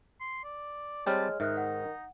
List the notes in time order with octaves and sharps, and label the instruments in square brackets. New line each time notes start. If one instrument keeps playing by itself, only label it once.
[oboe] C6
D5
[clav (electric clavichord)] G3 C4 G4 [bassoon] G#3 [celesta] C#5 F6 [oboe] A5
[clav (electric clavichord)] G#2 [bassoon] D#3 [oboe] D#4 [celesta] E5 F6 F#6
[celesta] F#5